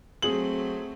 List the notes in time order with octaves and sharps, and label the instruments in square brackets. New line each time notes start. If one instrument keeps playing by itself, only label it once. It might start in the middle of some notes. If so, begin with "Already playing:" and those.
[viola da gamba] F#3 A3 C4 [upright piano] G#4 F#7